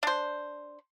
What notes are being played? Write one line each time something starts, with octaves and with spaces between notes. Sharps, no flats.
D4 C5